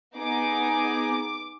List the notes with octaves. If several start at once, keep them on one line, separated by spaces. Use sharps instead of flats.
B3 D#4 G#4 D6